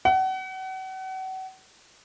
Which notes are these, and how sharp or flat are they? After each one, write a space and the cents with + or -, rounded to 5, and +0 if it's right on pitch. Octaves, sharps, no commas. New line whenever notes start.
F#5 +35